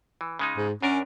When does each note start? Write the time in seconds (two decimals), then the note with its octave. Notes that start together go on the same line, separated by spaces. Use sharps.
0.21 E3
0.39 C#3 G#3 D#4
0.57 G#2
0.82 F#2 C#4 D4 A#4